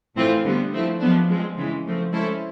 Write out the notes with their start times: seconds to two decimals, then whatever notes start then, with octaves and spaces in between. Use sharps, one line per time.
0.16 A2 E3 A3 C4 F4
0.44 D3 G3 B3
0.72 F3 A3 C4 E4
1.00 F3 G#3 B3 D4
1.29 F3 G#3 C4
1.56 C#3 E3 G#3
1.85 F3 A3 C4
2.12 G#3 C#4 E4 A4 C5